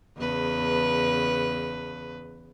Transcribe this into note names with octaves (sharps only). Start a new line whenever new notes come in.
E2 C#3 B4